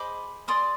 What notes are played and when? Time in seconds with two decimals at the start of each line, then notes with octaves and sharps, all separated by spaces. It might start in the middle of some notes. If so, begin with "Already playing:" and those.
Already playing: G#4 C5 D#5 B5 D6
0.48 G#4 D5 C6 D#6